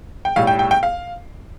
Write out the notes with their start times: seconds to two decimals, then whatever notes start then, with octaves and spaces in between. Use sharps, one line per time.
0.25 G5
0.36 B1 A2 G3 F5
0.47 G5
0.59 G5
0.71 G5
0.83 F5